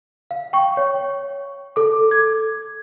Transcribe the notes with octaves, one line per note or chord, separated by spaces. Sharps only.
F5
G5 C#6
C#5
A4 D6
G#6